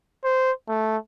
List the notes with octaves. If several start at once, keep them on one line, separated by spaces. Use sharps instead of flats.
C5
A3